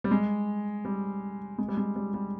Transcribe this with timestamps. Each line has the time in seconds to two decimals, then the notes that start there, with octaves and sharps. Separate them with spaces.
0.04 G3
0.11 G#3
0.85 G3
1.58 G#3
1.68 G3
1.77 G#3
1.96 G3
2.14 G3